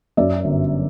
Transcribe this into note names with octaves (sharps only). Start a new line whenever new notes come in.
F#2 D5 E5
G1